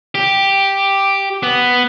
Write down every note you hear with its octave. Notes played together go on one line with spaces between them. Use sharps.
G4
B3